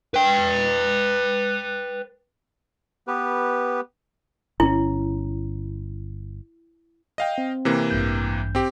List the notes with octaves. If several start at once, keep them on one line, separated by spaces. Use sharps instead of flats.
B4 G5
B3 G4 B4
G1 C#4 E4
D#5 F5 G5
C4
C3 E3 A#3
A1 G2 G6
C4 G4